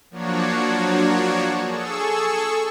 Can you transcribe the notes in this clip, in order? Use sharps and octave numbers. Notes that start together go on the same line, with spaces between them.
F3 F#3 A#3 D4 F#4 C#5
G#4 A4 C#6 E6